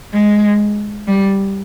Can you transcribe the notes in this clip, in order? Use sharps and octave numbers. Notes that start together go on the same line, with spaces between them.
G#3
G3